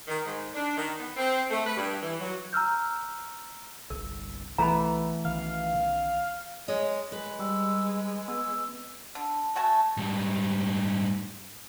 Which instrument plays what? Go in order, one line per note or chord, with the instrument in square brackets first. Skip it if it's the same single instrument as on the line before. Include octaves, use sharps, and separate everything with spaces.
[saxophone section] D#3
G#2
D4
D#3
B3
C4
A3
B4
G2
E3
F#3
[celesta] A#5 E6 F6 G6
[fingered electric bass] G1 C2 [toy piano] A#4
[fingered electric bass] B1 [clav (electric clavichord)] E3 A3 B3 [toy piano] A#5 B5
[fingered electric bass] B1 D#3 [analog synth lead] F5
[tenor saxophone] G#3 [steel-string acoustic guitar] C#5 D#5
[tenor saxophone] G#3 [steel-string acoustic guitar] B4
[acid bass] G3 [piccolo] E6
[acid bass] B3 [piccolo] E6
[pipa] D3
A3 F#4 G#5 A5
[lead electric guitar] G#2 G3